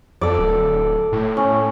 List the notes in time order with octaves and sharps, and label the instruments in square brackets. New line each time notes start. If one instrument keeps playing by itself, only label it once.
[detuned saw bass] F2 [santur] A4 D5
[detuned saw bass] D1
A2
[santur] C#4